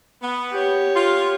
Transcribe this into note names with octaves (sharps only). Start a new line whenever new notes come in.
B3
G4 C#5
F4